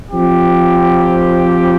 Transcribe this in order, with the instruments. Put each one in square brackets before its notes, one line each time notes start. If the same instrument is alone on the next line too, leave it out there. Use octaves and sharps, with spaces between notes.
[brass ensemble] F3 C4 G4